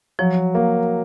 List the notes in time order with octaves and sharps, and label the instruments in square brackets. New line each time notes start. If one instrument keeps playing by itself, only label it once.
[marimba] F3 [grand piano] F#3
[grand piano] A#3